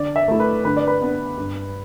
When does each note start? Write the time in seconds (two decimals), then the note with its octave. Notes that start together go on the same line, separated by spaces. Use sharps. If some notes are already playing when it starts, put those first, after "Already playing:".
Already playing: D3 D5
0.16 E5
0.28 A3 E4
0.40 B4
0.65 D3 B4
0.76 D5
0.88 B4
1.01 B3 D4
1.37 G2